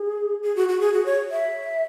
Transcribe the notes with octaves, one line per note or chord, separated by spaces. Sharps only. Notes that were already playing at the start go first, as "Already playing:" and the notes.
Already playing: G#4
G#4
F#4
F#4
G#4
F#4
C#5
E5